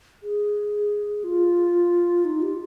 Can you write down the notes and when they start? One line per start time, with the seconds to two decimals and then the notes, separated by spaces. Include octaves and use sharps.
0.23 G#4
1.24 F4
2.25 D#4
2.42 G4